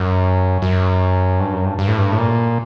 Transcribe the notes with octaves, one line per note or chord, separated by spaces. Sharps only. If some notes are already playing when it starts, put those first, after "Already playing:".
Already playing: F#2
F#2
G2
F#2
G2
G2
A2
G2
A2
A#2